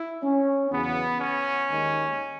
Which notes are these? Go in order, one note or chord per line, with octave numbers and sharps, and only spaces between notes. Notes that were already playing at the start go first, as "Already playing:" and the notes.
Already playing: E4
C#4
E2 C#3 F#3 B3
C#4
D#2 D#3 G#3